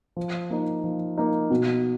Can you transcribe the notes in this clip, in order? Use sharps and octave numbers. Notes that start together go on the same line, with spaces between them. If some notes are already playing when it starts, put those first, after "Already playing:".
F3
A#3 D#4
F3
A#3 D#4
B2